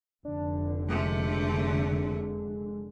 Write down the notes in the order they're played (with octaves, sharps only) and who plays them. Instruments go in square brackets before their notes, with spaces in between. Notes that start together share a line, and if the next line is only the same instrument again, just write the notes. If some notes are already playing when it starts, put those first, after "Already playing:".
[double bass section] F1 D3 [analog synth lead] D4
[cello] C3 A3 [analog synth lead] G#3